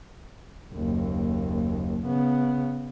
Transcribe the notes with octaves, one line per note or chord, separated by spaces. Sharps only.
F#1 D#2
C#3 B3